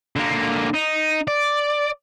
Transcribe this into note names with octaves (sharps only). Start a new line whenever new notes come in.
D3 A#3
D#4
D5